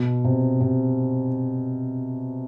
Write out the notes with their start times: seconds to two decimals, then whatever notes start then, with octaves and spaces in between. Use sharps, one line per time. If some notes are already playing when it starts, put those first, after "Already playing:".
Already playing: B2
0.24 C3
0.61 C3